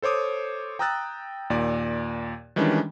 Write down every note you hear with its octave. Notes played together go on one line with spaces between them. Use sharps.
A4 C5 C#5 D6 D#6
G5 A#5 D#6 E6 F#6 A6
D#2 A#2 D5
D#3 E3 G3 G#3 C#4 D4